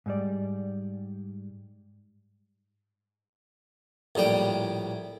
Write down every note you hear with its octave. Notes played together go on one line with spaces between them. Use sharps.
G#2 G3 D5
A#1 A2 G3 G5